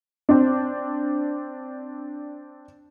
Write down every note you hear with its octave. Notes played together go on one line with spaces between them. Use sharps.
C4 D4